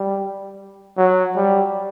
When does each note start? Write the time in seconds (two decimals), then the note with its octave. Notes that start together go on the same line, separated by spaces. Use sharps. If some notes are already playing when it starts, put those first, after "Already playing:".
Already playing: G3
0.97 F#3
1.36 G3